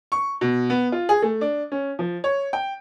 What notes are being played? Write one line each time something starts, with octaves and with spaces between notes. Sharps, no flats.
C#6
B2
B3
F4
G#4
A3
D4
C#4
F3
C#5
G5